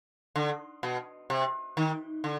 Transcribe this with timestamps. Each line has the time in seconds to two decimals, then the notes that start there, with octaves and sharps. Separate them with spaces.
0.36 D3
0.83 B2
1.30 C3
1.77 D#3
2.24 D3